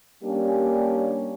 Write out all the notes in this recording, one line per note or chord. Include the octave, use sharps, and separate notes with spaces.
G3 A#3 C#4 D4 G4